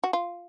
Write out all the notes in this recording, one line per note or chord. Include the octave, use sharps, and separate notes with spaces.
F#4
F4